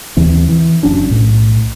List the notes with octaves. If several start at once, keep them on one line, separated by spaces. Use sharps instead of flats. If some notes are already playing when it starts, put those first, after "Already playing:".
D#2 E3 C4
E3
F#1 F#3 C#4 D4
B1 A2